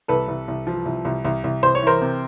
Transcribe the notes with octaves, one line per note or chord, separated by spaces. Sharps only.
C2 A4 B4
C2
C2
F3
C2
C2
C2
C2
C2 C5
C#5
E3 A#4 C5
C3